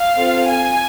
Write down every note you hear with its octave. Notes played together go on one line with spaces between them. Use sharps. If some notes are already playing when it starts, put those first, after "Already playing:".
Already playing: F5
C4 F4 A4
G#5